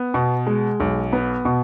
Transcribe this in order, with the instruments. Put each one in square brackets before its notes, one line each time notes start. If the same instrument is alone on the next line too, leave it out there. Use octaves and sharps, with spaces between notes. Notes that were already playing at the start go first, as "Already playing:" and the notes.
Already playing: [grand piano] B3
B2
G#3
B1
B3
B2